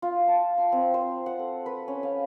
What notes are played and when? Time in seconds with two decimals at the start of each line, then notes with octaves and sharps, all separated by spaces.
0.02 F4
0.28 A5
0.58 C6
0.72 C4
0.94 C5
1.26 F#5
1.39 A4
1.66 B4
1.88 C#4
2.03 F5